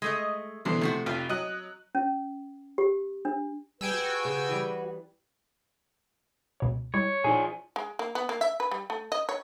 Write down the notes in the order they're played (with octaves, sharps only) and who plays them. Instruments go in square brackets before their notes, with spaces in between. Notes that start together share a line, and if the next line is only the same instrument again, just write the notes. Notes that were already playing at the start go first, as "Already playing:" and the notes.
[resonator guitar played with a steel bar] G#3 A3 D#5
[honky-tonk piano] B2 D3 E3 [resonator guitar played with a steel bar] C5
[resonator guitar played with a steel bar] C3 F3 F#4 [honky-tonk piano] A3
[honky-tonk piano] F1 [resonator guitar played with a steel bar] F4 G4
[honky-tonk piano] F#3 F#6 [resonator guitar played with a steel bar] D#5
[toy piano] C#4
G4
D4
[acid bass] G3 [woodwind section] G4 G#4 B4 [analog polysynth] G5 G#5 E6
[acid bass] F#4
[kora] C#3 C#4
E3 G3
[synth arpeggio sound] C#2 B2 C#5
[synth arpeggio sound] G3 G#3 E4 [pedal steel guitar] C#5
[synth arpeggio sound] A#2 D#4 [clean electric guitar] F3 G#4
[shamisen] G#3
A#3
B3
A#3
E5
B4
G3
A3
D#5
C#5